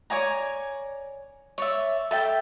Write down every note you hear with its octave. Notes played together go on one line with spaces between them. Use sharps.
C#5 D5 G#5 A#5
C#5 D5 E5
A4 E5 G5 A5